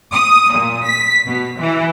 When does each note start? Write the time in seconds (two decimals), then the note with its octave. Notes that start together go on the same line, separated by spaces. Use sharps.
0.12 D#6
0.53 A#2
0.85 B6
1.26 B2
1.59 E3